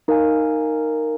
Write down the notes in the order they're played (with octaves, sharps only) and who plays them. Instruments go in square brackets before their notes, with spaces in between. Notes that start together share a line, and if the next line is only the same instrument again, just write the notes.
[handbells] D#4 A#4 F5 G#5